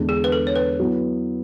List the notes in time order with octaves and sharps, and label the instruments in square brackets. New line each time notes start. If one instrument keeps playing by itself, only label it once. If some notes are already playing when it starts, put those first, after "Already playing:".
Already playing: [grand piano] E2 D3 G#3 D4
[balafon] G#4
B4
A4
C#5
B4
[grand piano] F#3 B3 E4